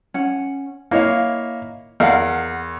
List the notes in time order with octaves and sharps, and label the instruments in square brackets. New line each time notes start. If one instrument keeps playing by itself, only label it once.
[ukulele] C#4 F#5
[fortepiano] A#3 C#5 [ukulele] E4 D#5 F5
[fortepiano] E2 [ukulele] A#4 F5 F#5